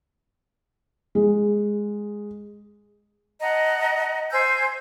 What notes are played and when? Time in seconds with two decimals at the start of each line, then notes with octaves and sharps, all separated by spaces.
1.15 G#3
3.41 D#5 F#5 A5 A#5
4.32 C5 G#5 E6 G6